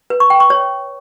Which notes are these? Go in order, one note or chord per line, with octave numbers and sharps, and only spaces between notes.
B4
C#6
G5
C#6
C#5